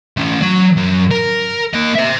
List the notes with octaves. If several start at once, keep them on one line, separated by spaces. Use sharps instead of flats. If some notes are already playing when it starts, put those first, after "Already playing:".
A3 C#4
F#3 F#5
F#2
A#4
A#3 D#5
C5 E5